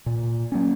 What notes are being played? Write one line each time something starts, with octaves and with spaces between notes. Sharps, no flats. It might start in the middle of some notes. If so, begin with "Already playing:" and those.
A#2
F#3 A#3 C#4